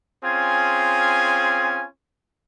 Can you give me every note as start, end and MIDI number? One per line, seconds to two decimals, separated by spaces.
0.24 1.85 60
0.24 1.85 61
0.24 1.85 65
0.24 1.85 68
0.24 1.85 80